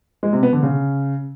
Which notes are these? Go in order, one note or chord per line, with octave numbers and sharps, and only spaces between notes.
G#3
C3
B3
D3
C#3